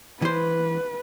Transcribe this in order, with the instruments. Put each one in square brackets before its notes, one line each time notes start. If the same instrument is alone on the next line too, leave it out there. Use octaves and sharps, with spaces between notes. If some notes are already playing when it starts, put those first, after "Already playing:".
[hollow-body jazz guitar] E3 C5 [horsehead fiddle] B4